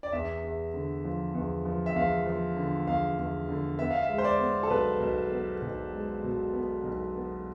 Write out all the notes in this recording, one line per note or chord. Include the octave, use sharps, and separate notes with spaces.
D5
E2 E5
E2
D3
F3
E2
F3
E5
E2 F5
F3
D3
E2 F5
E2
D3
B3 E5
F5
E5
G#3
C5
D5
B3
A4
B1 B4
B1
B3
B1
G#3
B2
B3
B1
B3